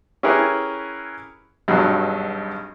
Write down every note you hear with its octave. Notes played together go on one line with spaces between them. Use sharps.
C#4 E4 G4 G#4 A#4 B4
G#1 G2 B2 F#3